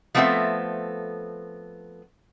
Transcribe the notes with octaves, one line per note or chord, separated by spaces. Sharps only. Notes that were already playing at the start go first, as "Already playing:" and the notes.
F3 A3 B3 C4 A4 E5